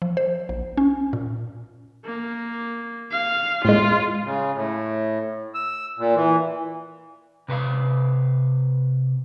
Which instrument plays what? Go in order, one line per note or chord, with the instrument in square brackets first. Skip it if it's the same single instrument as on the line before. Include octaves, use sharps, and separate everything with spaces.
[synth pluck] F3
C5
A#1
C#4
A#2
[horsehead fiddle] A#3
F5
[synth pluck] A2 G#3 [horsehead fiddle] F4
[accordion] C#3
A2
E6
A#2
E3
[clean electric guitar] C3 B4 C5 F5